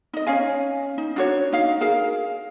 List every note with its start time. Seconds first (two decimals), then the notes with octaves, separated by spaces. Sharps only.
0.13 D#4 D#5
0.27 C#4 C#5 F5 G#5
0.98 D#4
1.16 D4 F#4 C#5
1.53 D#4 F#4 F5
1.81 G#4 A#4 F5